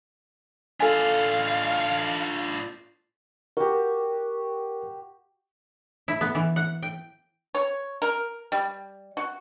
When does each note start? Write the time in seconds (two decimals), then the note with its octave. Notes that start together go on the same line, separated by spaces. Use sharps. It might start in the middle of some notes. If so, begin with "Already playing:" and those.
0.80 D4 F4 A4 F5 G#5
3.57 F#4 G4 A#4
6.08 E4
6.21 B3
6.35 E3
6.56 F#5
6.83 G5
7.55 C#5
8.02 A#4
8.52 G3
9.17 F#4